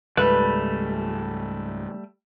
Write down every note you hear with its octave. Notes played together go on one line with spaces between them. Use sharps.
C#2 G#2 G3 A3 B4